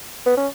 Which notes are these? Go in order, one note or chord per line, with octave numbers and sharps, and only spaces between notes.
B3
C#4